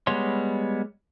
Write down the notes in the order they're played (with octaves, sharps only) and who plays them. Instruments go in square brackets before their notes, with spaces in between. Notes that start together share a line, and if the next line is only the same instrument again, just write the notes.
[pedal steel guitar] G3 G#3 B3 C#5 C6